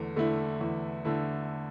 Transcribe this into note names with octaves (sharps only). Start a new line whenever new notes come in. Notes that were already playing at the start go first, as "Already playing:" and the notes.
Already playing: E2 D3 A3
D3 A3 E4
E2
D3 A3 E4